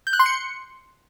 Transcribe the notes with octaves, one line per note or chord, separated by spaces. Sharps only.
G6
F#6
C6
C#7